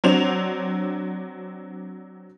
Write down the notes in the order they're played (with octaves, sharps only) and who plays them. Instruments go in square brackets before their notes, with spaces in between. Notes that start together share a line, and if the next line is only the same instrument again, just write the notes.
[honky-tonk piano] F#3 C4 D4 C5 F7